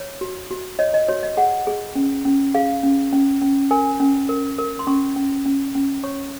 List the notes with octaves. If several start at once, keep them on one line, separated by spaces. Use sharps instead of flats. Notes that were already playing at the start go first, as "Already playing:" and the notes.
Already playing: C#5
F#4
F#4
C#5 D#5
D#5
F#4 C#5
D#5
G#4 F#5
G#4
C#4
C#4
G#4 F5
C#4
C#4
C#4
A#4 G#5
C#4
A#4
A#4
C6
C#4 C#6
C#4
C#4
C#4
C#5 C#6